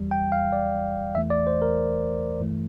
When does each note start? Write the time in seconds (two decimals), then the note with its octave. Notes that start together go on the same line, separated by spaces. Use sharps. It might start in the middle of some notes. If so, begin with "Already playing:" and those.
Already playing: E2 E3 G3
0.11 G5
0.32 F5
0.52 D5
1.15 E2 E3 A3 E5
1.30 D5
1.47 C5
1.62 A#4
2.40 G2 E3 A3